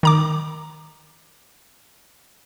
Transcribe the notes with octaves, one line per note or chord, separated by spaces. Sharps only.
D#3 A#5 D6